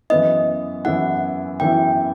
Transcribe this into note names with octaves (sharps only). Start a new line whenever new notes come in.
F#2 E3 B3 E4 D#5
F#2 E3 B3 E4 F#5
F#2 E3 B3 E4 G5